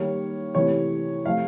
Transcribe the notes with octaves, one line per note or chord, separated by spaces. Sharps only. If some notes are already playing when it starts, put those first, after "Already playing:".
Already playing: D#3 G3 A#3 C#5
C3 E3 A3 C#5
C3 F3 A3 F5